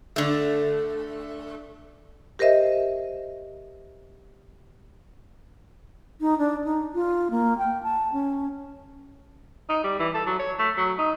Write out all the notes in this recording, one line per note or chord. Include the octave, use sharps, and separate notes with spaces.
D3 A3
G4 A#4 C5 D#5 E5
D#4
D4
D#4
F4
A#3
G5
A5
C#4
D#4
G3
E3
A4
F#3
C#5
A3
F#3
D#4